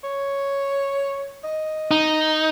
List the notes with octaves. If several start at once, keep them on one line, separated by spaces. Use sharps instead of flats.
C#5
D#5
D#4